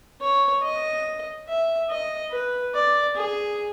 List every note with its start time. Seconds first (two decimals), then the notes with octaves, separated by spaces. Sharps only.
0.21 C#5
0.63 D#5
1.48 E5
1.90 D#5
2.31 B4
2.75 D5
3.16 G#4